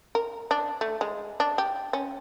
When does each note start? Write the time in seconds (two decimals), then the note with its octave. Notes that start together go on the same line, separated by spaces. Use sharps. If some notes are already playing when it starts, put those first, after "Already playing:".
0.15 A#4
0.51 D4
0.81 A3
1.01 G#3
1.40 D4
1.58 G4
1.93 C#4